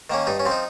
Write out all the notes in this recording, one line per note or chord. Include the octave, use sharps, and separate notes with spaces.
D#3 A#3 C#4
G2 D#4
C#4
F3 C4
D#4